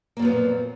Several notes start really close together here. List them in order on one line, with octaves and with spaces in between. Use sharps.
A#3 F#2 F3 B3 A#2